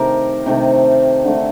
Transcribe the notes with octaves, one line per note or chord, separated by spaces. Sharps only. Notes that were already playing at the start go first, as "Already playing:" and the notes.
Already playing: C3 D#3 A3 G4 A#4
C3 D#3 A3
D3 A3